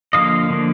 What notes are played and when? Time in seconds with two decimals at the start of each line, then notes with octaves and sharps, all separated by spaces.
0.13 D3 F3 A#3 D#5 F5
0.50 D3 F3 A#3